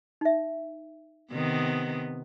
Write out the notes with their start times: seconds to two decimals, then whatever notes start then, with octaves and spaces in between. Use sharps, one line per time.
0.21 D#4 E5
1.32 C3 D#3 B3